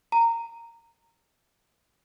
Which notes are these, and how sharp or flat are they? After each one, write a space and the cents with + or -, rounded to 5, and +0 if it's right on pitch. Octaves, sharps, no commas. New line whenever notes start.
A#5 -15